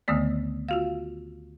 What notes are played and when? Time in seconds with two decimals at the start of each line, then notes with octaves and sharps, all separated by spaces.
0.08 D2 D3 D#3 A3 B3 D5
0.69 F4 F#4 F5